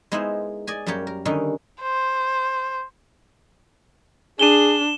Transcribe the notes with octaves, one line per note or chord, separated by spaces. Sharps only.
G#3 B3 D#4 E4 A#4 C5
D5 D#5 G#5
F#2 G3 A#3 G4 C#5
A#4
D3 D#3 G3 C#4 D#4
C5
D4 G#4 D#7 E7 G7